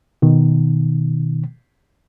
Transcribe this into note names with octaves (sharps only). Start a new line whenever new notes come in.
B2 D#3